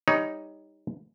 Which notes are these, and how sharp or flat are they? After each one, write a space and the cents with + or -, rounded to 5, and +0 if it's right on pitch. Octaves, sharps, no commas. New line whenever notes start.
G3 +20 D#4 +5 C#5 +20